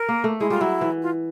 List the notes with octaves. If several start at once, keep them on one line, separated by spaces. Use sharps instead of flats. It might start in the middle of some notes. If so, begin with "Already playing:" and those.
Already playing: A#4
A#3
A3
G#3 E4
G3 F4
F#3 E4
E3
F4